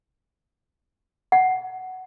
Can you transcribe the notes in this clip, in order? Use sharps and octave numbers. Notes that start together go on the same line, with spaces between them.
F#5